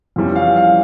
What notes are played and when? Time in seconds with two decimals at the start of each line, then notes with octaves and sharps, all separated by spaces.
0.16 F2 E3 G3 C#4
0.35 F5
0.56 F5